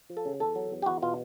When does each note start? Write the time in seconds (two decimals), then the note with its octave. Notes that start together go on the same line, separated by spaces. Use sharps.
0.10 F3
0.17 A4
0.25 C#3
0.40 E2 A4
0.55 F#3
0.71 E2
0.82 G4
0.86 E2 F#4
1.02 B2 F4